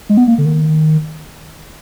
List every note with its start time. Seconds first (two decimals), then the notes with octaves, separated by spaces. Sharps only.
0.09 G#3
0.17 B3
0.28 A#3
0.38 D3
0.46 D#3